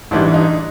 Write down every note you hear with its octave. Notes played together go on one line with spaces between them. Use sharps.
A1 G#2 E3 G3 D4
D#4